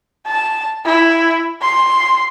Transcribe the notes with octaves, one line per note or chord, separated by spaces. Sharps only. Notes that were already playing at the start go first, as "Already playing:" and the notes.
A5
E4
C6